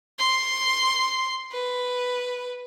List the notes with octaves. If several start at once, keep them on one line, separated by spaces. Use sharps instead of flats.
C6
B4